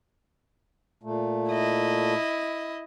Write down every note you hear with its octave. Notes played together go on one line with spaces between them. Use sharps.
A#2 A3
E4 D#5